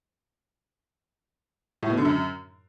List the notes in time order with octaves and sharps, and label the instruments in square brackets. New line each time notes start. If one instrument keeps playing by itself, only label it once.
[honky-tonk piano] A2
B2
D3
F#2